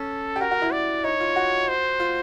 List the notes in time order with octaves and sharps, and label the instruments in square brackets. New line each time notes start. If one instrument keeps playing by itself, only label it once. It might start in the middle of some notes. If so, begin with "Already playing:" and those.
Already playing: [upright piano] C#4 [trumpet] A4
[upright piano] G4
[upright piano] F#4 [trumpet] A#4
[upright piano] F#4
E4
[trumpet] D5
[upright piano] D#4 [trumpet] C#5
[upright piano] F4
F#4
[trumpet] C5
[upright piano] F4